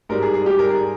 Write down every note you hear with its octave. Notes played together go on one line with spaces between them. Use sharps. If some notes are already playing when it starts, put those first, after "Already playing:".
G#2 G3 A#4
G#4
G#4
G#2 G3 G4
A#4
G#4